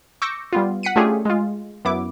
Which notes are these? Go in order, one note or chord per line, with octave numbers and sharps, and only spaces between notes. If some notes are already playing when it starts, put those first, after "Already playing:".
C#6 D6 E6 G6 A#6 C#7
G3 B3 F4
F#5 B6 C#7 D#7
A3 C#4 D4 F4 G4 G#4
G#3 F4
F#2 B3 E4 D6